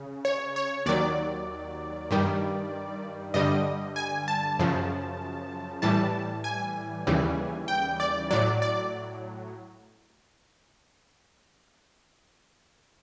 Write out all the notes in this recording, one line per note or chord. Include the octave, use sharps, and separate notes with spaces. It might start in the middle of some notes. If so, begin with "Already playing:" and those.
Already playing: C#3
C#5
C#5
D#2 D#3 F#3 D5
G2 D#3 G3
G2 D3 G3 D#5
G#5
A5
F#2 C#3 F3
A2 E3 G3 A5
G#5
D#2 C#3 E3 G3
G5
D5
A2 F#3 D5
D5